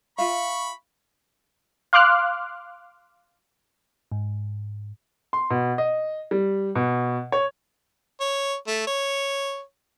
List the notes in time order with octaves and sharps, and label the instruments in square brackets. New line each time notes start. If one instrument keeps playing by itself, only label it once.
[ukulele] F4 E5 F5 [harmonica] B5 C#6
[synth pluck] F5 C6 D6 F6 F#6
[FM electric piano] G#2
[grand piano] C6
B2
D#5
G3
B2
C#5
[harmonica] C#5
A3
C#5